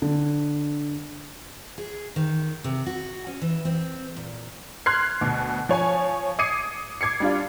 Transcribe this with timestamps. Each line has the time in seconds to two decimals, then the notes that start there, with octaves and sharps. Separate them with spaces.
0.02 D3
1.78 G#4
2.16 D#3
2.64 C3
2.86 F#4
3.27 C#4
3.42 E3
3.65 C4
4.17 A#2
4.86 C6 F6 F#6 G#6 C7
5.21 D2 B2
5.69 F3 C#5 G#5
6.39 D6 D#6 G#6 C7 C#7 D#7
7.01 D6 G#6 C7 C#7
7.20 G3 D4 F4